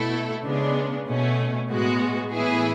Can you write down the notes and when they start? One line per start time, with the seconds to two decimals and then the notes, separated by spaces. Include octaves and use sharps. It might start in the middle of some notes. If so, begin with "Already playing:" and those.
Already playing: B2 A3 E4 A4
0.45 C#3 G#3 B3 D4
1.07 B2 A3 C#4
1.69 A2 G#3 B3 F#4
2.31 A2 E3 B3 E4 G#4